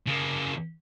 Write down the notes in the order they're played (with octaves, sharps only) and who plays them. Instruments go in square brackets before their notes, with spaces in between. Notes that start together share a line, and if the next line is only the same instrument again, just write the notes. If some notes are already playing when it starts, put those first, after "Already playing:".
[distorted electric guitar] C#3 A#3